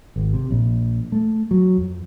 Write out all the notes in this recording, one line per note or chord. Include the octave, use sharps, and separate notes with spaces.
G#1
C3
A#1
A3
F#3
F2